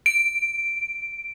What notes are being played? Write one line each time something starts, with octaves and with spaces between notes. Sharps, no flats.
D7